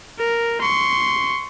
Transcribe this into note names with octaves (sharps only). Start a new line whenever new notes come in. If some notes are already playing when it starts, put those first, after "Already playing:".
A#4
C6 C#6